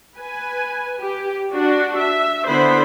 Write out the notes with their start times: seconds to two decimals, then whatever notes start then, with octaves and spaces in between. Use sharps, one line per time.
0.17 B4 G#5
1.00 G4
1.53 D4 F#4
1.98 E5
2.48 D3 B3 E4 C5 B5